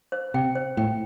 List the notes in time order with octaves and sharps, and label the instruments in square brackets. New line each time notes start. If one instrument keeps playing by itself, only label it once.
[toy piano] C5
[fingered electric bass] C3 [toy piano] G5
[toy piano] C5
[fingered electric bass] A2 [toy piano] G5